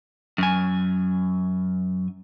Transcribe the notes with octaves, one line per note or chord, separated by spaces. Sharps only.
F#2 G#5